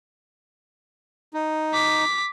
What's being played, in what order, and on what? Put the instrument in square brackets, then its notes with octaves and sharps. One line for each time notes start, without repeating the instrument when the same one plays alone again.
[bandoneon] D#4
[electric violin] D6 B6